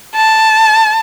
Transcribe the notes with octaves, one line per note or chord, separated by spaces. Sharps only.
A5